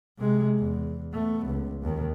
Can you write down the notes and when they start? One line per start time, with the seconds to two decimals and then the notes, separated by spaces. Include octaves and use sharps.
0.18 C3 G#3
0.58 E2
1.14 A3 B3
1.47 C#2
1.83 D#2 D#3